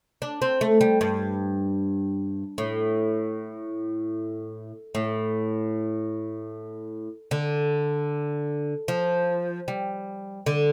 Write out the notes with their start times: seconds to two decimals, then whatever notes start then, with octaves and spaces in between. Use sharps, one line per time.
0.22 D4
0.42 C4
0.61 A3
0.81 G3
1.01 G2
2.58 A2
4.95 A2
7.31 D3
8.88 F3
9.68 G3
10.46 D3